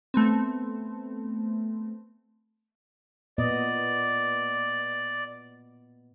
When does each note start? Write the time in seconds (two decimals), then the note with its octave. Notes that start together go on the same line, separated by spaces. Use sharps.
0.14 A3 B3 C4
3.38 A#2 B3 D5 D#5